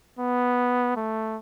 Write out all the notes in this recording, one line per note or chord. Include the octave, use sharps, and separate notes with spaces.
B3
A3